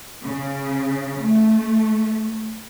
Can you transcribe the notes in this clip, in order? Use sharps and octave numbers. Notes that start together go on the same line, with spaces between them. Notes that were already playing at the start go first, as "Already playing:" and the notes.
C#3
A3